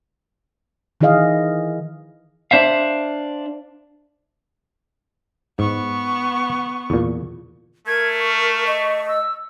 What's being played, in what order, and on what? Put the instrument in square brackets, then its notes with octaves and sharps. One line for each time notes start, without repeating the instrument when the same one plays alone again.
[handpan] D#3 E3 E4 G#4 D#5 F5
[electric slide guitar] D4 C5 E5 F5
[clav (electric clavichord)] G#2 [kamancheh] B3 C#6
[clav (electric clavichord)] E2 A#2
[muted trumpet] A3 [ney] A#4 [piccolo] G#6
[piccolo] C#6
[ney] D#5
[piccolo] E6